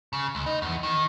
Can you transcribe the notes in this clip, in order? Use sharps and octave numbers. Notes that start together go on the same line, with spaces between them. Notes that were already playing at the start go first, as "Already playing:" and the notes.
C#3
C#2
D#4
E2
D#3